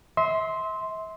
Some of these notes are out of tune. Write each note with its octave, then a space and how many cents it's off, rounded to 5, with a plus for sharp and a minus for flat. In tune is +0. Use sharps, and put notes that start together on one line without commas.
E5 -35 C6 +0